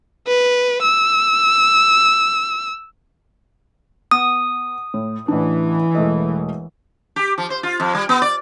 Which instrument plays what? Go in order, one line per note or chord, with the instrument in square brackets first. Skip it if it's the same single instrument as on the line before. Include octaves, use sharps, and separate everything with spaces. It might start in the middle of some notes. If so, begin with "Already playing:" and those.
[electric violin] B4
E6
[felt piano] B3 [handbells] D#6
[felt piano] A2
[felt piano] A1 D4 [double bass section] E3
[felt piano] E1 A3 D#5
[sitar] G4
F3
C5
F4
F2
G3
B3
D5